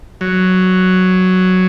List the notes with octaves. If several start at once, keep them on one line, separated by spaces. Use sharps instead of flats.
F#3